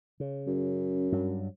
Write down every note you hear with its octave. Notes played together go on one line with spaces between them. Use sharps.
C#3
F#2
G2 F#3